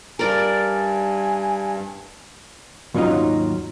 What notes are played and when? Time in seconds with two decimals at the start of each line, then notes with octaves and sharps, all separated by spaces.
0.19 G2 A#4 D5 G#5
2.94 D#2 G#2 F#3 C#4 D#4 F4